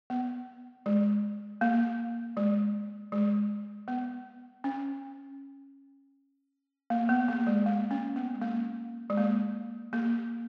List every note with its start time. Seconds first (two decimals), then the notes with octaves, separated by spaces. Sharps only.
0.10 B3
0.86 G#3
1.61 A#3
2.37 G#3
3.12 G#3
3.88 B3
4.64 C#4
6.90 A#3
7.09 B3
7.28 A#3
7.47 G#3
7.66 A#3
7.91 C#4
8.16 B3
8.34 G#3
8.41 A#3
9.10 G#3
9.17 A#3
9.93 A#3